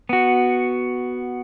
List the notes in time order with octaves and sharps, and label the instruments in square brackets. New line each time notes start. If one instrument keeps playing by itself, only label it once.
[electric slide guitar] B3 F#4